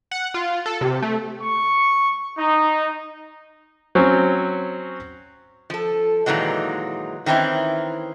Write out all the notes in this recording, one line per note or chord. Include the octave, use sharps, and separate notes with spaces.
F#5
F4
A4
C3
A3
C#6
D#4
F#3 C4 C#4
F3 A4
A#2 D#3 E3 F#3 G#3
D#3 E3 C4 C#4 E4